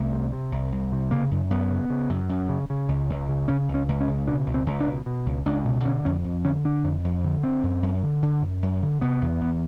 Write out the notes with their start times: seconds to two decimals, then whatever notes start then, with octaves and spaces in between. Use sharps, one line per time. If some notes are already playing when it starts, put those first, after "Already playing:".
Already playing: C2 A3
0.12 C3
0.32 C3
0.52 C2
0.72 C2
0.92 C3
1.11 C#3 A#3
1.31 F#2
1.50 F#2 B3
1.70 C#3
1.90 C#3
2.09 F#2
2.29 F#2
2.49 C#3
2.70 C#3
2.88 C#2
3.09 C#2
3.29 C#3
3.48 C#3 C#4
3.68 C#2
3.74 C#4
3.88 C#2
4.00 C#4
4.08 C#3
4.28 B2 D4
4.46 C#2
4.54 C4
4.66 C#2
4.80 D4
4.87 B2
5.06 B2
5.26 C#2
5.46 C#2 D4
5.65 B2
5.85 D3 C#4
6.05 F2 C#4
6.24 F2
6.44 D3 C#4
6.65 D3 D4
6.84 F2
7.04 F2
7.24 D3
7.43 D3 C4
7.63 F#2
7.83 F#2
8.03 D3
8.22 D3
8.42 F#2
8.63 F#2
8.82 D3
9.01 C3 B3
9.21 E2
9.41 E2